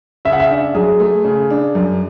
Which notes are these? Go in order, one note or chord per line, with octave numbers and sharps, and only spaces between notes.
C#3 E5
F#5
E5
D4
F#3 G#4
A3
C#3
D4
F#2